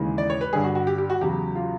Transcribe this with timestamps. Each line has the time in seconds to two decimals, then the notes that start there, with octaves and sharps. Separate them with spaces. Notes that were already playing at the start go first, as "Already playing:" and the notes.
Already playing: D#2 C#3 E3 G#3
0.18 D5
0.30 C#5
0.41 B4
0.53 G2 D3 G3 G#4
0.64 F#4
0.75 F#4
0.87 G4
0.98 G4
1.10 F#4
1.21 E2 C#3 F#3 G4
1.55 F4